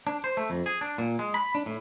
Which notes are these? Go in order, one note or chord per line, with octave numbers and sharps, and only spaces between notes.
D4
C5
A3
F2
G#4
D4
A#2
G#3
B5
D4
A2